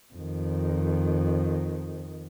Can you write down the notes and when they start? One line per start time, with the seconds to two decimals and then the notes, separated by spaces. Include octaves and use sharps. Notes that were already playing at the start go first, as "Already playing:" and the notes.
0.14 F2 D#3